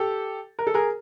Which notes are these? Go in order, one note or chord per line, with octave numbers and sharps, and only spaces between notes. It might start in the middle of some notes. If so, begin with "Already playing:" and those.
Already playing: G4 A4
A#4
A4
G#4 A#4